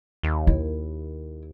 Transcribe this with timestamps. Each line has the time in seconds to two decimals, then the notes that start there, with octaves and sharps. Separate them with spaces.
0.23 D#2
0.47 E4